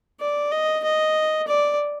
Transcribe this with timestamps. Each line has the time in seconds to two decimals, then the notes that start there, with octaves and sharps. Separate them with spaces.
0.20 D5
0.52 D#5
0.84 D#5
1.48 D5